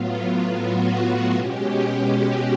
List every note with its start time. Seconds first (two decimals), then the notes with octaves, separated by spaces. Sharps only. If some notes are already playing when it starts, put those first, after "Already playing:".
Already playing: A2 F#3 B3 F4
0.55 F#4
1.33 B2 G#3 C#4 G4
2.11 F#4